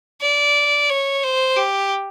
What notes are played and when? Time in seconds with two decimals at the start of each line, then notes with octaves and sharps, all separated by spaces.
0.21 D5
0.89 C#5
1.23 C5
1.57 G4